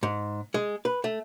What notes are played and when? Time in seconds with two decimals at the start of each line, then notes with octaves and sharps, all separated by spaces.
0.03 G#2
0.54 G#3
0.85 B4
1.04 A3